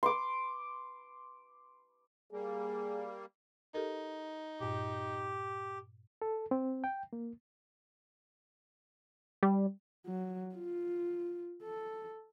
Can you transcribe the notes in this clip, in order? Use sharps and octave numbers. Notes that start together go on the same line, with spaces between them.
C6 D6
G3 A#3 G#4
D#4 G4 A4 A#4
G2 A#2 G4
A4
C4
G5
A#3
G3
F#3
F4
A4